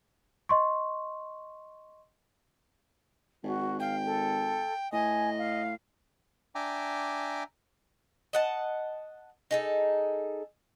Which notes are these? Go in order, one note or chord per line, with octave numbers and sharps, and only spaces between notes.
D#5 C6 C#6
G#1 F#4
F5 G5
A4
A2 D#5 G#5
F5
D4 E5 G5 G#5 A#5 D6
D#5 F#5 A5
D#4 G#4 A4